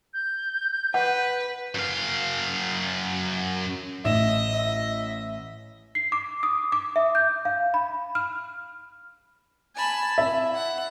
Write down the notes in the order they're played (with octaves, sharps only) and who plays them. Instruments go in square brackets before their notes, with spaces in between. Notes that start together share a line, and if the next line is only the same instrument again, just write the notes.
[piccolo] G6
[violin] B4 [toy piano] F#5
[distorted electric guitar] F#2 F5
[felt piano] A1 E7 [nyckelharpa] D#5 [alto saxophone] E5
[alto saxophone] E5
[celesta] C7
D6
D#6
D6
E5
G6
F5
B5
F6
[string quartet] G#5 A5 B5
[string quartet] E4 [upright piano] E5
[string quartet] F#5